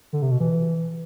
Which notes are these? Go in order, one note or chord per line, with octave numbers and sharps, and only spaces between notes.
D3
C3
B2
E3